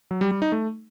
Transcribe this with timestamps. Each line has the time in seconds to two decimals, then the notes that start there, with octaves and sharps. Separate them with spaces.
0.11 F#3
0.21 G3
0.31 G3
0.42 D#4
0.52 A3